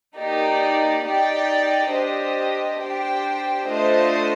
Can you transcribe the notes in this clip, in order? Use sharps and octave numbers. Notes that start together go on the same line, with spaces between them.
A#3 D#4 G4 D5
D#4 G4 D5 G5
D4 G4 C5 D#5
D4 G4 C5 G5
A3 D4 F4 C5 D#5